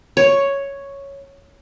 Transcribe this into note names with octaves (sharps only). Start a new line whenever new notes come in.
C#5